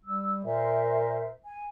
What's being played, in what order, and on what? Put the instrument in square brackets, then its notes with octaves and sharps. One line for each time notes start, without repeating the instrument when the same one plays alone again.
[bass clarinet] G3 [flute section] E6
[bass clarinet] A#2 [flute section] A#4 C5 E5
[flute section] G#5